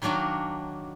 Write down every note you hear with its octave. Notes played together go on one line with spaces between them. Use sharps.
D#3 F#3 A#3 D4 F#4